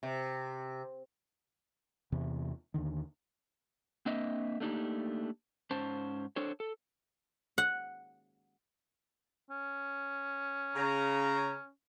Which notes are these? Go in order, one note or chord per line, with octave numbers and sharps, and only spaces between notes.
C3
E2 C3 E3
D#2 B2 D3 D#3
A#3 C4 D4 D#5 E5
A3 A#3 D4 D#4 G4
G#2 C#4 C5 A5
D4 A4 C5 C#5
A4
F#5
C#4
C#3 A#5